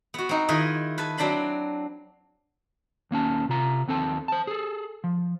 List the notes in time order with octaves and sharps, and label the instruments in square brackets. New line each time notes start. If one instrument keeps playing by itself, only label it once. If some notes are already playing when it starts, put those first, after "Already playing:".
[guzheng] B3 F#4
C4 D#4
D#3 E4 F4 G#4 B4 D#5
B4 G#5 A5
F#3 C4 D4 A5 B5 C6
[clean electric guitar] D#2 A#3 C#4 A5
C3 F4 A#5
D#2 C4 A4 A5
C5 A5
G#4 A4
F3